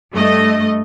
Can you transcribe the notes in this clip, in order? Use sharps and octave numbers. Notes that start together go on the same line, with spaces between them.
G2 A3 D#5